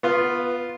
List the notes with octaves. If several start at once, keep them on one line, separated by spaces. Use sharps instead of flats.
B3 F4